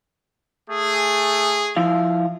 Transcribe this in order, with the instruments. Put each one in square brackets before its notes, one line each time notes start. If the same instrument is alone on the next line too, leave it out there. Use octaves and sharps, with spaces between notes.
[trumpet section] A3 G#4
[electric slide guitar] F3 E4 F5